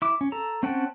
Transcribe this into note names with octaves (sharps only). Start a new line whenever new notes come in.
E4 D6
C#4
A4 A#5
C4 C#4 F#5 G5 A5